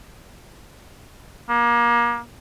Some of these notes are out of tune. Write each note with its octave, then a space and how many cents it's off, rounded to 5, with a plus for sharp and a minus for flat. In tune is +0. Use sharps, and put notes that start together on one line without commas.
A#3 +30